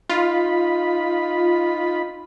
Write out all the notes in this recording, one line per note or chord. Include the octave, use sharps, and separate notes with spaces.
D#4 F4 B5